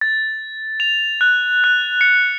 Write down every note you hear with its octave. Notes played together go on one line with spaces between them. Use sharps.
A6
F7
F#6
F#6
C#7